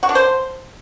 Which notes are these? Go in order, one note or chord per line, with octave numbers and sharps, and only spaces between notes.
F#4
D4
C5